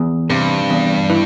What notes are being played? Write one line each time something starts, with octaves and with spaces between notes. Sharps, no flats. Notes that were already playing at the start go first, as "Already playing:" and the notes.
Already playing: E2
G2 C3
E2
E3